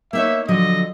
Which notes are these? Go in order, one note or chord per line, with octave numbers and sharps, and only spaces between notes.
A#3 D#4 C#5 E5
D3 F3 F#3 D#5